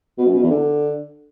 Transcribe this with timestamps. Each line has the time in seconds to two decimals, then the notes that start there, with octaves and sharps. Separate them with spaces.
0.18 B2
0.26 F#2
0.34 B2
0.42 E2
0.50 D3